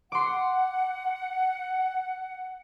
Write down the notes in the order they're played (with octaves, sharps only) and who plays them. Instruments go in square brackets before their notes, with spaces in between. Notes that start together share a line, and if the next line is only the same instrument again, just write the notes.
[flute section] F#5 [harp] C6 D6